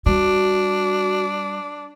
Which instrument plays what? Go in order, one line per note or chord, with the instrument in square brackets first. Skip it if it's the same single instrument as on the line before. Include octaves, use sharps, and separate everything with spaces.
[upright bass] G3 [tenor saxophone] D4 [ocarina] F#4